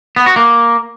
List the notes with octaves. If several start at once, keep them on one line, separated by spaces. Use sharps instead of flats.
B3
F#4
A#3